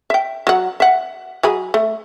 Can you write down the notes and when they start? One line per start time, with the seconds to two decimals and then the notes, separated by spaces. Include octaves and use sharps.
0.10 E5 G5
0.47 F#3 F#5
0.80 E5 F#5
1.43 F#3 G#4 B5
1.74 A3